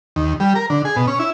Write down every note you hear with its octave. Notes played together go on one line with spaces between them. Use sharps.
D#2
G3
A#4
D3
G#4
B2
C#4
E4